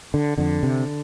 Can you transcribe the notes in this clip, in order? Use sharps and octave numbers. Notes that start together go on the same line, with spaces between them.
D3
F2 D3
C3